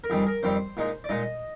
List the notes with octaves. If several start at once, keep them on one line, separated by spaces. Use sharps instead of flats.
A#4
F2 D#3 G3 C4 G#4
A#4
F2 D#3 G3 C4 C5
A#2 G#3 D#4
D5
A#2 G#3 D#4 D#5